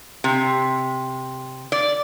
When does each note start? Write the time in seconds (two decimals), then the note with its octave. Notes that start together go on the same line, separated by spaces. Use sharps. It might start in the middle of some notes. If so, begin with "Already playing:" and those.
0.24 C3
1.72 D5